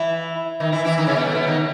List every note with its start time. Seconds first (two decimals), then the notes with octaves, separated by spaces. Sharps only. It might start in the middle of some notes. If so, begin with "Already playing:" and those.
Already playing: E3 E4
0.60 D#3 D#4
0.72 E3 E4
0.85 E3 E4
0.98 D#3 D#4
1.07 C#3 C#4
1.16 B2 B3
1.25 A2 A3
1.35 B2 B3
1.47 D#3 D#4